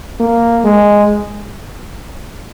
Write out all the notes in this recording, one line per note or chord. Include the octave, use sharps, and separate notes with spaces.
A#3
G#3